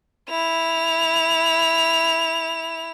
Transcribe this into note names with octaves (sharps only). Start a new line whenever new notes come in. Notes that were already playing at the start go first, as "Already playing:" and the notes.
E4 F7